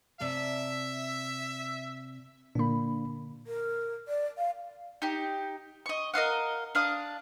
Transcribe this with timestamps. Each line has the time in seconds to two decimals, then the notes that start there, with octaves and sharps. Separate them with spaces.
0.20 C3 D5 E5 A5
2.55 A#2 D3 A#3 D4 B5
3.47 A#4
4.08 D5
4.38 F5
5.02 D#4 G4
5.86 D#5 C#6
6.14 A#4 D#5 F5 F#5
6.75 D4 F5 D#6